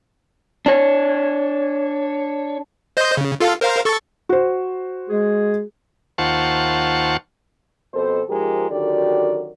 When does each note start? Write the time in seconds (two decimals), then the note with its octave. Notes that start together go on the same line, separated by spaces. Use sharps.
0.66 D4 C#5
2.97 C5 D#5 G6
3.17 C#3
3.40 F4 A4 F5
3.61 A#4 C5 F5
3.85 A4 C#6 A6
4.29 F#4 C5
5.09 G#3 G#4
6.18 D#2 F4 C5 F#5 A5 C#6
7.94 F2 B2 A4 C5
8.30 G#2 F3 G#3 G4 G#4 A#4
8.71 F#2 D3 D#3 F#4 G4 D5